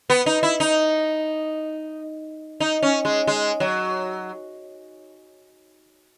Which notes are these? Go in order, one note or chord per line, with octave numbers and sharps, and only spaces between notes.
B3
D#4
E4
D#4
D#4
C#4
G#3
G#3
F#3